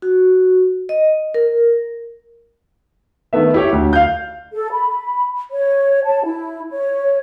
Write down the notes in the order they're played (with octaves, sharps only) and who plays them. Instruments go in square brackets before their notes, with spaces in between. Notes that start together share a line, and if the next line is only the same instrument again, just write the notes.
[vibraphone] F#4
D#5
A#4
[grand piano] D#3 A3 B3 E5
E4 G4 C#5
D2
F5 G6
[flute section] A4
B5
C#5
A5
E4
C#5